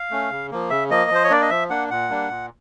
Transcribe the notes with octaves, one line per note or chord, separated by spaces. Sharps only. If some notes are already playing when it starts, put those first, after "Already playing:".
Already playing: F5
A3 C#4
C#3
F3 A#3
C#3 E5
F3 A#3 D#5
F3 C5
C#5
A#3 D4 D5
D#5
F3 E5
A#3 D4 F#5
A#2 F#5
G3 A#3 D4
A#2